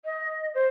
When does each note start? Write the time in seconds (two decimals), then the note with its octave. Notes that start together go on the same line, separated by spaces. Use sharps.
0.04 D#5
0.54 C5